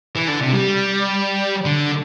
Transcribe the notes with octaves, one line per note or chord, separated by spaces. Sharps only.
E3
D3
C3
G3
D3